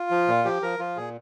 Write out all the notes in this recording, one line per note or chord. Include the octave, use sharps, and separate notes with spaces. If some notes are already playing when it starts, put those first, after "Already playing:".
Already playing: F4
F3
A#2
F3 G4
F3 A#4
F3 F4
A#2 G#4